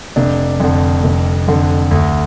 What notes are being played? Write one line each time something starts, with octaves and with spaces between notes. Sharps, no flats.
F1 D4
F2 D3
F1
F2 D3
D2